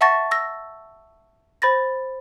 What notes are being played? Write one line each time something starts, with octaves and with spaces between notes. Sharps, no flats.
E5 F#5 A5 C#6 A6 A#6
E6 A#6
C5 B5 A6 A#6